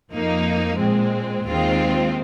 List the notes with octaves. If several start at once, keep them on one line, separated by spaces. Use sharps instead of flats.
F2 F3 A#3 D#4
A#2 G#3 C4
D#2 D#3 G#3 C4 F4